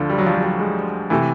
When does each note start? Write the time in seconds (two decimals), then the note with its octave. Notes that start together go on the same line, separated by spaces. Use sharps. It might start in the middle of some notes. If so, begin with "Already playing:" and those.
Already playing: D2 D3 F3
0.10 G3
0.19 F#3
0.26 F3
0.34 F#3
0.43 G3
0.59 G#3
1.10 C3 E3 A3